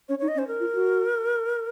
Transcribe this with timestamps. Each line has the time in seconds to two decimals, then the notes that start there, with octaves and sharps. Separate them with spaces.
0.09 C#4 C#5
0.19 D#4 C#5
0.28 D#5
0.35 C#4
0.38 C5
0.48 A#4
0.60 F4
0.74 F#4